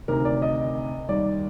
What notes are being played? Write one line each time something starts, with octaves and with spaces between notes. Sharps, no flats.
D2 C3 D#3 A#4
D5
D#5
D#2 D#3 G3 D5